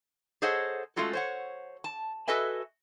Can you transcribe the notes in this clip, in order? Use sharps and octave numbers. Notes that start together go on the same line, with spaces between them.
G#4 A4 C5 C#5 D#5 F#5
G#3 A3 C#4 F4 F#4 A4
C5 C#5 F#5
A5
F#4 A4 B4 D#5 E5 G#5